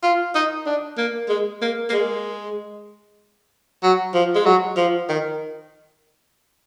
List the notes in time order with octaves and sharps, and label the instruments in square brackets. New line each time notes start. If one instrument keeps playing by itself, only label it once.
[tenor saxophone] F4
D#4
D4
A#3
G#3
A#3
A#3
G#3
F#3
F3
G#3
F#3
F3
D#3